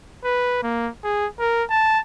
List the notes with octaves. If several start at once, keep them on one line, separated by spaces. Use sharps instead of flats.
B4
A#3
G#4
A#4
A5